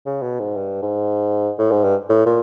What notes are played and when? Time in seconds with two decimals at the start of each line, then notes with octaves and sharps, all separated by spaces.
0.06 C#3
0.22 B2
0.40 G#2
0.57 G2
0.82 G#2
1.59 A2
1.71 G#2
1.84 G2
2.10 A2
2.26 A#2